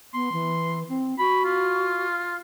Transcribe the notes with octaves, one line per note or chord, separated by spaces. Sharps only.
B3 C6
E3
C4
F#4 B5
F4